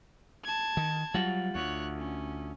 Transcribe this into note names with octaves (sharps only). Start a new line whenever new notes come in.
A5 G#6
D#3
F#3 G3 F4 F#5
D2 C#5 F#6
C#4